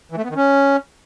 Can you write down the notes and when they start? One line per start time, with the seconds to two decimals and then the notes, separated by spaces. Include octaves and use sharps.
0.12 E3
0.18 A3
0.24 B3
0.30 D#3
0.36 C#4